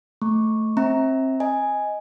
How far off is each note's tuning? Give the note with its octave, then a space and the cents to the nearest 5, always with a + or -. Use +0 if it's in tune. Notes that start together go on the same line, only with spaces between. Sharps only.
A3 +0 C#6 -10
C4 +25 E5 -30 A#5 +0
D#5 +0 G#5 +0